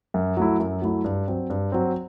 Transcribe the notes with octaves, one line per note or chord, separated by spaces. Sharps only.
F#2
F#3 A3 E4
F#2
F#3 A3 E4
G2
F#3 C4
G2
F#3 C4